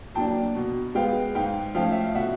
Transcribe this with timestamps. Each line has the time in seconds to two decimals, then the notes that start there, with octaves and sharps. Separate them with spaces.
0.15 F#3 A#3 D4 G5 A5
0.55 B2
0.95 G#3 B3 F5 G5
1.35 G#2 F5 G5
1.75 F3 A3 C#4 F5 G5
1.92 E5
2.04 F5
2.15 B2 E5 F#5